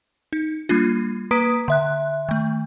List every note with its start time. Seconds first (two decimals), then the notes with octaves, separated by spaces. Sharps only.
0.33 D#4
0.69 G3 A#3 D4 F4
1.31 A#3 B4 A#5 D#6 B6 D7
1.68 D3 E5 F#6
2.29 D#3 A3